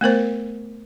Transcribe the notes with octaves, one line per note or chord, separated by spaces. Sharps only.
A3 B3 A#4 C5